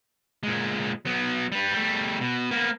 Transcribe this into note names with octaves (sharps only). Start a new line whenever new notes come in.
A#2 G#3
F#3 B3
G3 B4
G3 A3
B2
A#3 B3